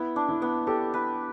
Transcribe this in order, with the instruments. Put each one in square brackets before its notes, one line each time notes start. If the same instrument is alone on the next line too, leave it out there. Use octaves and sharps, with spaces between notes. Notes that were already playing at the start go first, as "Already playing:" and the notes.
Already playing: [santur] B3 [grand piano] E4
[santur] D4
[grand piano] E4
[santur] B3
[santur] G4 [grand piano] A4
[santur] B4